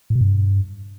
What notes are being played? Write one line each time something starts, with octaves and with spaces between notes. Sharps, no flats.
A2
B2
G2